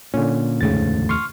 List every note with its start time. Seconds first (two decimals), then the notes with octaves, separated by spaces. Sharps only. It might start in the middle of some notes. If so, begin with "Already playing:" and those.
0.14 A#2 D3 C#4
0.61 F1 D#2 G#2 C#3 A3 A6
1.09 C6 C#6 F6